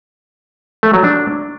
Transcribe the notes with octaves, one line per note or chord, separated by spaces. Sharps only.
A3
F#3
D4